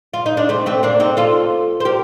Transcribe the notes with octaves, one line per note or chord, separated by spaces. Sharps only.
F4
D#4
D4
A3 C4
A3 C4
A#3 D4
C4 D#4
F4 A4
C5
G4 A#4